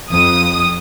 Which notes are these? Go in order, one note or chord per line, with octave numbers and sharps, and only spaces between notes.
F2 D#6